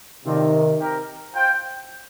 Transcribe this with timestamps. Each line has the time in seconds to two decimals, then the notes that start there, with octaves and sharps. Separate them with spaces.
0.25 C3 D#3 A3 C4 F4 A#4 D5
0.79 C4 G4 A#4
1.33 F4 C5 G5